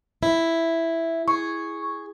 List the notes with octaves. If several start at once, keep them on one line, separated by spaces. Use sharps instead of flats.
E4
G#4 C#6